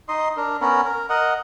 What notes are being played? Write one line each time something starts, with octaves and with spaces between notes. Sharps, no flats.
D#4 D#5 C6
D4 A#4
B3 C#4 A#4
A#4
A#4 D#5 F#5